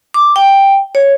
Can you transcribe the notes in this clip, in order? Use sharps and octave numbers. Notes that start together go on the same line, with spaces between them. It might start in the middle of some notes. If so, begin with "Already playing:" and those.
D6
G5
C#5